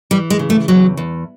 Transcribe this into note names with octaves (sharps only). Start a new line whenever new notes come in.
E3 G3
G#3
C#3
A3
E2 F#3
E2